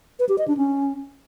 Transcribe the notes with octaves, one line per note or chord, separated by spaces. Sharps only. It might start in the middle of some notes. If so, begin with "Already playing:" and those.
B4
G4
D#5
D4
C#4